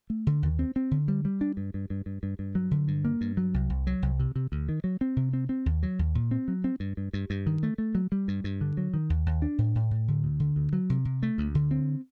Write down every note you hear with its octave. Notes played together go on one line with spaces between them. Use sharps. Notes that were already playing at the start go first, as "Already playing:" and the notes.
A3
D3
D#2
C4
C4
D3
G3
G3
D4
G2
G2
G2
G2
G2
G2
F#3
D3
G2
A#3
G2
F#3
C2
C2
F#3
C2
C3
C3
D2
D#3
F#3
C4
C3
C4
C4
D#2
F#3
D#2
A#2
C4
F#3
C4
G2
G2
G2
G2
D#3
A3
A3
F#3
G3
G2
G2
D3
F#3
D#3
D#2
D#2
D4
A2
A2
A2
D3
D2
D3
D2
F#3
C3
C3
A3
D2
D3
C4